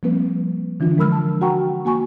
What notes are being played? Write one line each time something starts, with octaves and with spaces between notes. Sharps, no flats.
F3 G3 A#3 C4 B4
D3 E3 D4 F4
F3 G#3 A#4 B5 E6 F6
A5
F#4 F#5 G5 A#5 C#6
A#3 F#4 G#5 C#6